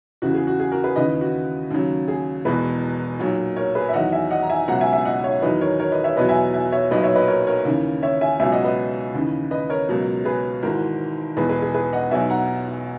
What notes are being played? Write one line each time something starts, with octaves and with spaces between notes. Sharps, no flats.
E2 C#3 E3 F#4
G#4
F#4
G#4
F#4 A#4
G#4 B4
D#2 C#3 E3 B4 D#5
F#4
D#2 C#3 F#3
G#4
E1 E2 B2 G#4 B4
B1 A#2 F#3
A#4 C#5
G#4 B4
E5
E2 D#3 F#3 D#5 F#5
E5 G#5
D#5 F#5
A#5
E5 G#5
C#2 B2 F#3 F#5 A#5
E5 G#5
E5 G#5
D#5 F#5
C#5 E5
E2 D#3 F#3 B4 D#5
A#4 C#5
A#4 C#5
B4 D#5
C#5 E5
E2 B2 F#3 B4 D#5
E5 G#5
E5 G#5
C#5 E5
B1 A#2 F#3 B4 D#5
C#5 E5
B4 D#5
A#4 C#5
A#4 C#5
D#2 C#3 E3
C#5 E5
E5 G#5
C#2 B2 F#3 E5 G#5
D#5 F#5
B4 D#5
D#2 C#3 E3
B4 D#5
A#4 C#5
C#2 B2 F#3
G#4 B4
G#1 G#2 E3 F#4 A#4
E1 E2 B2 G#4 B4
G#4 B4
G#4
G#4 B4
D#5 F#5
B1 B2 F#3 E5 G#5
F#5 A#5